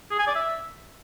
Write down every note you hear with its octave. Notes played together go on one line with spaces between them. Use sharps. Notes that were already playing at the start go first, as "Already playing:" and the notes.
G#4
G#5
D5
E5